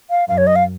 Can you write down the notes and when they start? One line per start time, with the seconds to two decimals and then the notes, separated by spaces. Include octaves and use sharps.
0.10 F5
0.28 F#2 F5
0.38 C#5
0.47 D#5
0.56 F5